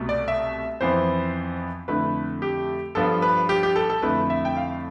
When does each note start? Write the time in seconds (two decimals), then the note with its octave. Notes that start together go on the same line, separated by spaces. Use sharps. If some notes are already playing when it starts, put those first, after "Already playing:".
Already playing: C2 B2 A3
0.09 D5
0.28 E5
0.81 F2 E3 B3 E4 C5
1.88 F2 D3 A3 E4 B4
2.42 G4
2.95 G2 F3 B3 A4
3.22 B4
3.49 G4
3.63 G4
3.76 A4
3.90 A4
4.02 F2 D3 A3 E4 B4
4.30 E5
4.45 G5
4.56 F5